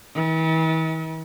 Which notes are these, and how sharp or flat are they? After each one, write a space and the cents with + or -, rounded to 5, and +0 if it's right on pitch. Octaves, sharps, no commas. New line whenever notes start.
E3 -45